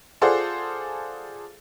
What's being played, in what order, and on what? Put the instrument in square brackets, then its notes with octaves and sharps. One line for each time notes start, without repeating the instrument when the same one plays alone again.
[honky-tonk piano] F4 G#4 A4 C5 D5 F#5